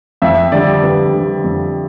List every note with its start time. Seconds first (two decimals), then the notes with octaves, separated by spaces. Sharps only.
0.22 F2 E5
0.52 D3 G3 D5
0.83 F2 B4
1.13 D3 G3
1.44 F2